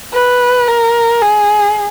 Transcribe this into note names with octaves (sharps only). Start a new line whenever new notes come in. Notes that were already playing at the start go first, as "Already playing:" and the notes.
B4
A#4
G#4